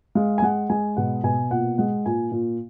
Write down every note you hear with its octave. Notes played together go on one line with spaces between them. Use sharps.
G#3 F5
G#5
G#3 F#5
G#3 G#5
B2 F#5
B2 G#5
A#2 F#5
G#3 F#5
A#2 G#5
A#2